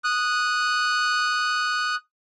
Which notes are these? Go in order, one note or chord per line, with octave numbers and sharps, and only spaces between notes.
D#6 F#6